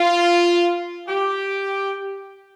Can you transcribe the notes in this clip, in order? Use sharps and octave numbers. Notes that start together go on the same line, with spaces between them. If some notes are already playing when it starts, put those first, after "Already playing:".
Already playing: F4
G4